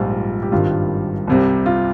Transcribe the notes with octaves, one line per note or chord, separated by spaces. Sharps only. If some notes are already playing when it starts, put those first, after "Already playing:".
Already playing: A#1 G#2 G3 F4
G4
G#1 G2 D#3 G3 F4
C2 C3 G3
F4